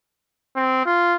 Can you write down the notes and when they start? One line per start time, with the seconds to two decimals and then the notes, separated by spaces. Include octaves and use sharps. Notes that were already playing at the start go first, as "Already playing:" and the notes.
0.56 C4
0.86 F4